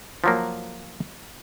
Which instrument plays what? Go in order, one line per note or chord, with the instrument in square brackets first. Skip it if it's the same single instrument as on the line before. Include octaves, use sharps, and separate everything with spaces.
[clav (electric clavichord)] F3 F#3 A#3